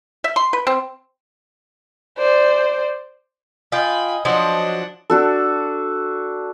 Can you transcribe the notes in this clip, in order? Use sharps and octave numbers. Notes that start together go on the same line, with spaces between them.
E5
C6
B4
C4
C5 D5
F4 D#5 G5 G#5 B5
F3 F#3 D4 D#5 F#5
D4 F#4 A4